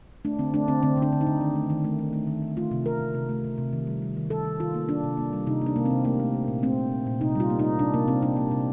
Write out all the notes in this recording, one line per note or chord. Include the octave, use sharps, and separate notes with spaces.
A3 D4
D3 C4
A3 D4
D3 C4
D3 C4
D3
D4
D3
D#4
D3
D#3
A3
D#3
A3
A3
A3
D#3
D#3
A3 F4
C3
C3 A#4
C3
C3
A3
C3
C3
D#3
G3
G3
D#3
G3 A4
D#3
D#3 F4
A#3
A#3 D4
C3
A#3
G3
C3 D#4
A#3 D4
C3 A#3
C4
C3
A3 A#3
A3
A3
A#2
A3 C4
A3
A#2
A#2
C3 D#4
G3 F4
A#3
D#4
A#3
C3 D4
C3 A#3
C3 C4
C3 D4
A#3
C3